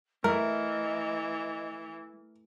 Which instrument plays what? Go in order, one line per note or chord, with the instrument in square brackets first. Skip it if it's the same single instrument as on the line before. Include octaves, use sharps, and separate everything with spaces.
[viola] E3 [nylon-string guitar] A3 [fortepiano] A#4 [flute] D#5